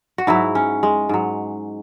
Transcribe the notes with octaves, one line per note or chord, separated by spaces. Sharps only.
F#4
G#2 F#3 E4
C#4
G#3
G#2 F#3